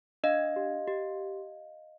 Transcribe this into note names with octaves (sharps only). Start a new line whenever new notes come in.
D4 D#5 F5
G4
G4